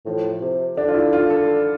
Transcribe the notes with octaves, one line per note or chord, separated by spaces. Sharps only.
A2 F3
C3
D3 D4
F4
E4
F4
A4